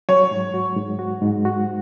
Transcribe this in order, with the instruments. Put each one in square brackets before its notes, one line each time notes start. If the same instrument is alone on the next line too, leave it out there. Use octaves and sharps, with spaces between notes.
[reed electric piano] F#3 [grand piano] C#5
[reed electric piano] G#2
F#4
G#2
F#4
G#2
F#4